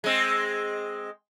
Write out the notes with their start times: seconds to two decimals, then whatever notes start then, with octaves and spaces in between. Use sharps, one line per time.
0.04 G#3 C4